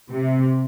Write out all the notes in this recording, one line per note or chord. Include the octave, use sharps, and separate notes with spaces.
C3